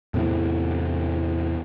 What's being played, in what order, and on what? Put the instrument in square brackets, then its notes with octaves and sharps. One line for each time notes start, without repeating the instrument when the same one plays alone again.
[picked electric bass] E2 A2 C3 E3